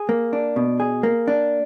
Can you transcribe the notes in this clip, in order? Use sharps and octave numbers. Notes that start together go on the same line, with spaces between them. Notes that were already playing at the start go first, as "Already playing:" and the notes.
Already playing: G#4
A#3
D4
B2
G#4
A#3
D4